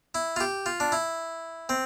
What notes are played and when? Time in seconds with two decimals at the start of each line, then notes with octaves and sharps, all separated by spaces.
0.15 E4
0.36 F4
0.40 G4
0.66 F4
0.80 D4
0.92 E4
1.69 C4